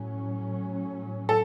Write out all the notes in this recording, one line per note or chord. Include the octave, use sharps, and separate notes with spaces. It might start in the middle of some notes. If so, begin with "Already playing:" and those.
Already playing: A2 F#3 C#4
A4